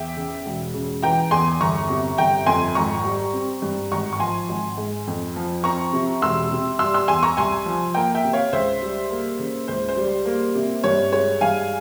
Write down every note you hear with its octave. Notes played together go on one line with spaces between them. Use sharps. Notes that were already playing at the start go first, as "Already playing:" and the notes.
Already playing: E2 E5 G5
C#3
E1
C#3
E3 G5 A#5
E2 G#5 C6
G1 A#5 C#6
C3
G1 G5 A#5
F2 G#5 C6
G#1 A#5 C#6
G3
C4
G2
G#1 A#5 C#6
C#6
F3 G#5 C6
G#1
G#2
F2
F3
C4 A#5 C#6
C3
E1 C6 E6
C3
G3 C6 E6
C6 E6
E2 G#5 C6
A#5 C#6
C2 G#5 C6
F3
A#3 G5 A#5
E5 G5
C3
C#5 F5
C#2 C5 E5
G3
A#3
C#3
C#2 C5
C5
G3
A#3
C3
G2 C#5
G#3 C#5
G2 F5 G#5